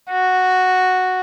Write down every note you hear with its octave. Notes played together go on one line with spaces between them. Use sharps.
F#4